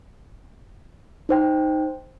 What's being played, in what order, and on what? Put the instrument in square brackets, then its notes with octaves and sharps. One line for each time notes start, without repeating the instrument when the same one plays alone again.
[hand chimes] D#4 C5 G5